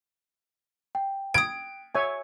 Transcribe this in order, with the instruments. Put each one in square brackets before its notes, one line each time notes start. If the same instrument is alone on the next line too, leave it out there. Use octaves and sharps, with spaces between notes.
[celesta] G5
[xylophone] D#6 G#6 [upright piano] D7
[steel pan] C#5 E5 G#5